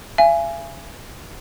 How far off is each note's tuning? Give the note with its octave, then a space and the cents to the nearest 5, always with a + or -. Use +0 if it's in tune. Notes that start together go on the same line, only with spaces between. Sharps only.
E5 +45 G#5 +0